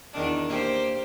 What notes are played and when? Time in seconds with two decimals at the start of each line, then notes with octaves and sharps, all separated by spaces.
0.13 E2 D#3 D4
0.49 A#3 G4 C5